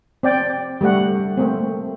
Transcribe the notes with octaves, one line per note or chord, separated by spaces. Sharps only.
C4 D5 G5
G3 A3 G4 F#5
A3 A#3 C4